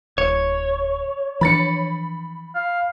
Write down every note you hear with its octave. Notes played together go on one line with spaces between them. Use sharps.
D1 C#5
E3 F3 D4 B5 A6 C#7
F5